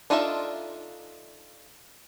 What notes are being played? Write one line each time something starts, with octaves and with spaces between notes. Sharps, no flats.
D4 D#4 F4 A4 E5